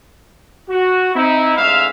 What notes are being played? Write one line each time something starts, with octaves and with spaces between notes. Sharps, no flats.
F#4
C4 D#4 E4
A1 G#2 E5 F5